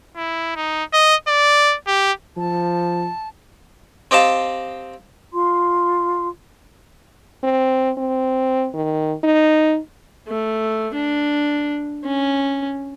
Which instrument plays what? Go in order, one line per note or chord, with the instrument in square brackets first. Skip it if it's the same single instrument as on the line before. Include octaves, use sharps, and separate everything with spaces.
[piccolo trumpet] E4
D#4
D#5
D5
G4
[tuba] F3 [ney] A5
[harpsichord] C4 G4 D#5 F5 A5
[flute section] F4 C6
[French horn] C4
C4
D#3
D#4
[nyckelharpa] A3
D4
C#4